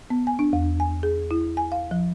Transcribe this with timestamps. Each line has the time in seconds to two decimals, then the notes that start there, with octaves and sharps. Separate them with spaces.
0.10 B3
0.27 G#5
0.39 D4
0.53 E2
0.80 G#5
1.03 G#4
1.31 E4
1.57 G#5
1.72 F5
1.91 F3